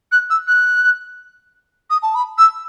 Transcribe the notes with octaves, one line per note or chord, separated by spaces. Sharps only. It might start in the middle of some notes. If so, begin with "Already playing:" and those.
F#6
E6
F#6
D#6
A5
B5
E6